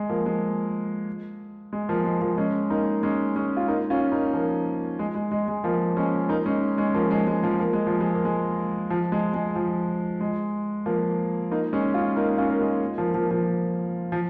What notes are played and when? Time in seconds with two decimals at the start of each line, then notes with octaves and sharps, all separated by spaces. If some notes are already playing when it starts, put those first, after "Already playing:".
Already playing: G#3
0.09 F3 A#3
0.26 G#3
1.73 G#3
1.89 F3 A#3
2.05 G#3
2.21 F3 A#3
2.38 G#3 C#4
2.70 A#3 D#4
3.03 G#3 C#4
3.36 G#3 C#4
3.57 F4
3.68 A#3 D#4
3.90 C#4 F4
4.12 A#3 D#4
4.33 F3 A#3
4.99 G#3
5.15 G#3
5.31 G#3
5.48 G#3
5.64 F3 A#3
5.96 G#3 C#4
6.29 A#3 D#4
6.46 G#3 C#4
6.78 G#3 C#4
6.94 F3 A#3
7.11 G#3
7.27 G#3
7.43 F3
7.59 A#3
7.73 G#3
7.87 F3
8.01 G#3
8.14 A#3
8.25 G#3
8.90 F3
9.12 G#3
9.34 G#3
9.56 F3
10.21 G#3
10.86 F3 A#3
11.51 A#3 D#4
11.73 G#3 C#4
11.94 C#4 F4
12.16 A#3 D#4
12.38 C#4 F4
12.50 A#3
12.60 G#3
12.98 F3 A#3
13.14 F3 A#3
13.31 F3 A#3
14.12 F3